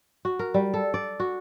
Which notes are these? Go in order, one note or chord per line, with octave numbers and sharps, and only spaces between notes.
F#4
A#4
G3
A4
D5
F#4